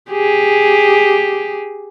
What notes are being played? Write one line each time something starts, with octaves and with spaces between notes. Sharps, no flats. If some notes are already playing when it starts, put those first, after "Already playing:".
G4 G#4